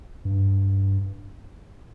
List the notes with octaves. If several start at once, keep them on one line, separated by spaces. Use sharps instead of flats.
G2